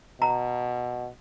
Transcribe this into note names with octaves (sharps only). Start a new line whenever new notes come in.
B2 A#5